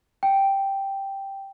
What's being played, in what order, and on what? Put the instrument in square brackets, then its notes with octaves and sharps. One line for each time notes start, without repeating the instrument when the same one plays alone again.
[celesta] G5